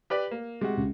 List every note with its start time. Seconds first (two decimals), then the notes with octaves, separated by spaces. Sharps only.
0.10 G4 B4 D5
0.31 A#3
0.61 C3 G#3 F#4
0.77 C#2